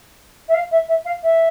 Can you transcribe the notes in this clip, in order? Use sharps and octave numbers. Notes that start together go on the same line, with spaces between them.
E5
F5
E5
E5
F5
E5